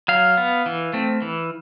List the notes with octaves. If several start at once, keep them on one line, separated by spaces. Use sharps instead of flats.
F#3 F5
B3
E3
A3 C4
E3